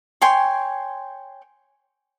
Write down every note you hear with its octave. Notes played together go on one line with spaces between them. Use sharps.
C#5 G5 G#5 C6